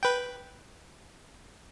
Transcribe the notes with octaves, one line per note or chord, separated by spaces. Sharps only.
B4 G5